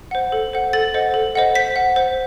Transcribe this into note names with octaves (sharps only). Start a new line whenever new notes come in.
C5 F#5
A4
C5 F#5
A4 A6
C5 D#5 F#5
A4
C5 D#5 F#5
C5 B6
F#5
C5